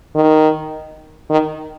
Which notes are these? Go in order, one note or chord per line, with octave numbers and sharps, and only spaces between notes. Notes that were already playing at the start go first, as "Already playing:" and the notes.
D#3
D#3